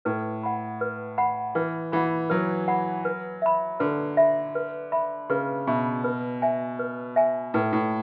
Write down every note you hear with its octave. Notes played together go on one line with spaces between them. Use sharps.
A2 B4
F#5 B5
B4
F#5 B5
E3 B4
E3 F#5 B5
F#3 B4
F#5 B5
B4
E5 B5
D3 B4
E5 B5
B4
E5 B5
C#3 B4
B2 E5 B5
B4
E5 G#5
B4
E5 G#5
A2 B4
A2